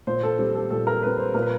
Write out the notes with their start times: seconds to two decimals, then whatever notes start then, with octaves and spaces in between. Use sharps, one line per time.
0.07 A#2 C5
0.23 A4
0.39 G3 C4
0.55 A4
0.70 A#2 A4
0.87 A#4
1.03 G3 C4 B4
1.18 C5
1.34 A#2 A#4
1.42 B4